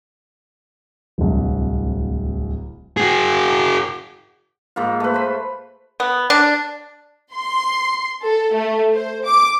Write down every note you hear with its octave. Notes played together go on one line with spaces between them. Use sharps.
D1 C2
F#4 G#4
G#2 A#3 F4
A3 B4
C5 B5
B3
D4
C6
A4
A3
C5
D6